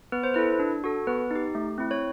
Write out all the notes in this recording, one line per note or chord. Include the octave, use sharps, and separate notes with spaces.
B3 B4
C5
E4 A4 B4
D4
F#4 A4
B3 B4
D#4 G4
A3
C4 E4
C#5